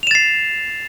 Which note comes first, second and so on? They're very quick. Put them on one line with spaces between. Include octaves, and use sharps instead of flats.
F7 E7 A6 C7